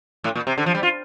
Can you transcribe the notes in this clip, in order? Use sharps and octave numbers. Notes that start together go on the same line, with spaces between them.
A2
A#2
C3
D3
F3
G3
F4